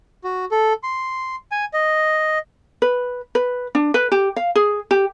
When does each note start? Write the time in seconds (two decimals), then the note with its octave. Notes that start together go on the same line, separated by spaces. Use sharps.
0.24 F#4
0.51 A4
0.83 C6
1.52 G#5
1.74 D#5
2.82 B4
3.35 B4
3.75 D4
3.94 B4
4.12 G4
4.36 F5
4.55 G#4
4.91 G4